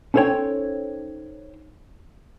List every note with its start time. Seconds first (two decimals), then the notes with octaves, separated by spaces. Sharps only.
0.14 C#4 D#4 A4 C5 C#5 G5